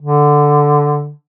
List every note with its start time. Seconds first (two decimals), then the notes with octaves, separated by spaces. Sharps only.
0.01 D3